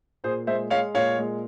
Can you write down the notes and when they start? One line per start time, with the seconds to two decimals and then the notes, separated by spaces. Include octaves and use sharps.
0.24 A#2 G#4 C5
0.47 G#3 C5 E5
0.70 G#3 C#5 F5
0.95 A#2 C#5 F5
1.18 G#3